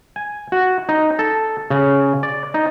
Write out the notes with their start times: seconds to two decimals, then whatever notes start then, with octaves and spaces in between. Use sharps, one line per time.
0.16 G#5
0.52 F#4
0.89 D#4
1.19 A4
1.70 C#3
2.23 D5
2.54 D#4